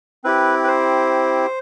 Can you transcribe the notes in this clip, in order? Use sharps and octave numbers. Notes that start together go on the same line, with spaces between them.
C4 E4 G4 B4
B4
C5